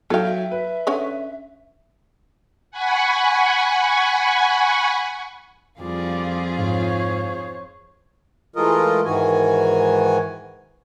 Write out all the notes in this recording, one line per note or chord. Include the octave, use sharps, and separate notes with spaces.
F#3 D#4 A4 F5 G5
E5
B4
D3 C#4 C#5
F#5 G#5 B5 C#6
F2 G3 F4 G#4 D5 F5
G#2 C5 C#5
E3 G#3 A3 F4 A#4 D#5
G#2 D#3 E3 F#4 G#5